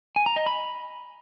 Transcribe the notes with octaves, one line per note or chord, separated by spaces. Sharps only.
G#5
A#5
D#5
B5